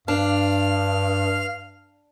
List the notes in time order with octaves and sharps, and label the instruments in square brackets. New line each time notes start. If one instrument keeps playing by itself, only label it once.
[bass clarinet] G2 [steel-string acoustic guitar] D4 [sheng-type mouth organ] F5 F6